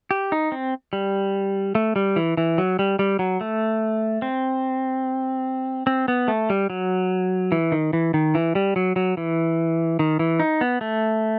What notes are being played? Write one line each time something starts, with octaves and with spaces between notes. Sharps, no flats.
G4
D#4
C4
G3
A3
G3
E3
E3
F#3
G3
G3
F#3
A3
C4
C4
B3
A3
G3
F#3
E3
D#3
E3
D#3
E3
G3
F#3
F#3
E3
D#3
E3
D#4
B3
A3